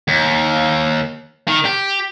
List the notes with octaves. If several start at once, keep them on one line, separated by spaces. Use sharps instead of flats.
D#2
D#3
G4